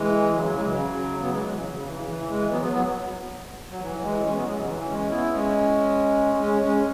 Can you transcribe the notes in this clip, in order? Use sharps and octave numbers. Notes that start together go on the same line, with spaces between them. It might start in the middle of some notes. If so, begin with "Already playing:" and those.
Already playing: E3 G#3
C#3 F#3
C#3 F#3
E3 G#3
C#3 F#3
F#3 B3
E3 G#3
E3 G#3
C#3 F#3
C#3
C#3
E3
C#3
E3
E3 G#3
F#3 B3
F#3 B3
F#3 B3
F#3
E3
F#3
E3 G#3
G#3 C#4
F#3 B3
E3 G#3
C#3 F#3
E3
G#3 C#4
B3 E4
G#3 C#4
G#3 C#4
G#3 C#4